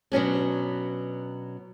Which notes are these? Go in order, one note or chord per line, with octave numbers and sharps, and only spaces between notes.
B2 F#3 C#4 D4